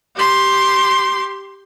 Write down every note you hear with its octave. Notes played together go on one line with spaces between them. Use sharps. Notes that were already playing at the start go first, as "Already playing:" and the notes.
G4 C6